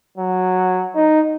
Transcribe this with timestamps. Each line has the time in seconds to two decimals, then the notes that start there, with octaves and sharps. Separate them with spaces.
0.17 F#3
0.95 D#4